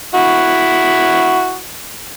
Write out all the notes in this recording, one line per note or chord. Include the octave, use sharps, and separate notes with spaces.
E4 F#4